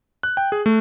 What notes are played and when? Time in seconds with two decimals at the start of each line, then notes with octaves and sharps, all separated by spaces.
0.23 F#6
0.37 G5
0.52 G#4
0.66 A3